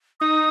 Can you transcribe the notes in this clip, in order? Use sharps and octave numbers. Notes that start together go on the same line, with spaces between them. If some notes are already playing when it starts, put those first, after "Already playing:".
D#4 D#6